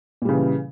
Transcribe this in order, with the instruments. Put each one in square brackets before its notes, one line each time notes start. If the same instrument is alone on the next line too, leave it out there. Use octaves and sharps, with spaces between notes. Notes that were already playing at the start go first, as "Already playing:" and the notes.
[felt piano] A#2
G3
C#3
E3